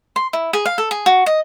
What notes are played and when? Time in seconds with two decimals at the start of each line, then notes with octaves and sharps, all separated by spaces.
0.16 C6
0.33 E4
0.53 G#4
0.66 F5
0.78 A4
0.91 G#4
1.06 F#4
1.26 D#5